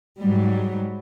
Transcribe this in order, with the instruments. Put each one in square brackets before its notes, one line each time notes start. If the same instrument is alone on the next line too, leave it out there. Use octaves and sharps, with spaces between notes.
[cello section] G#2 F#3 G3